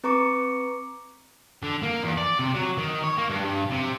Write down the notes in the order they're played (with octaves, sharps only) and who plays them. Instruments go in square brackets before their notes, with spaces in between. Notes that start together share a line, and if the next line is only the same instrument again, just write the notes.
[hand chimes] C4 B4 A#5 C#6 D6 C#7
[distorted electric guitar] D3
A#3
E2
D5
C3
F#3
D#3
C#5
A#3
G2
G2
C3